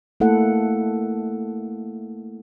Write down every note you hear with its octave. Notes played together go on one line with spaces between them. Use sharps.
A3 A#3 E4 A4 F#5